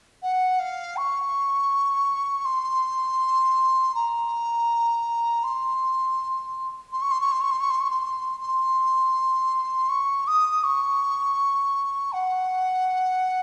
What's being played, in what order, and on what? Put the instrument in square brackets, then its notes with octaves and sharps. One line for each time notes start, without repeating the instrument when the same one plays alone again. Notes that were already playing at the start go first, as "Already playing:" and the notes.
[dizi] F#5
F5
C#6
C6
A#5
C6
C6
C#6
C6
C#6
C6
C#6
C6
C#6
C6
C#6
C6
C6
C#6
D#6
C#6
F#5